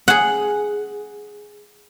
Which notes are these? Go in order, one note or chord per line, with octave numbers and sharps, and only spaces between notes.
G#4 F#5